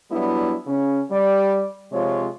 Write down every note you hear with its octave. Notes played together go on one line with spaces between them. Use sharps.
F#3 G3 B3 D4 E4
C#3 C#4
G3 D5
C3 F3 G#3 F4 C#5